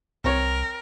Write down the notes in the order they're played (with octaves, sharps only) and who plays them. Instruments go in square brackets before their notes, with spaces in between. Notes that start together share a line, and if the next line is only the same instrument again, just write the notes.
[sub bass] C2 [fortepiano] C4 C#5 [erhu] A#4